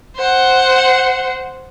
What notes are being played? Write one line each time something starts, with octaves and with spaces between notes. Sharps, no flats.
C5 F#5